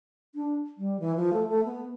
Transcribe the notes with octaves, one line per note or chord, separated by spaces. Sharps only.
D4
G3
E3
F3
A3
A3
B3